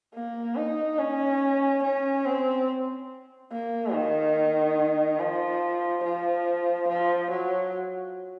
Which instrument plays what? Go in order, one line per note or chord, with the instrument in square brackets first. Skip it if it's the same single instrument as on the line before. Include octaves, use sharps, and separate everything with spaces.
[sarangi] A#3
D#4
C#4
C#4
C4
A#3
D#3
F3
F3
F3
F#3